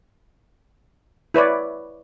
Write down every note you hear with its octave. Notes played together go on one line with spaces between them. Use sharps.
E4 B4 C#5 D5